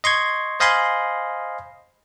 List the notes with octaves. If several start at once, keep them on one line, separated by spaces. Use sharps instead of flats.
D#5 C6 C#6 G#6
C5 D#5 F5 G#5 B5 C6